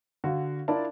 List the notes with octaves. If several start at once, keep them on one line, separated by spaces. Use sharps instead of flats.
D3 F#4 F5
D4 E4 F4 A#4 D5 A5